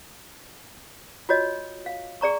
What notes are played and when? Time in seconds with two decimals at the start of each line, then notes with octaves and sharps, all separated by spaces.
1.29 F4 F#4 C#5 D#5
1.86 F5
2.21 G#4 D5 A#5 C#6